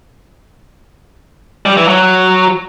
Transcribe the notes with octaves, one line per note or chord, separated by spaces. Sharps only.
G3
E3
F#3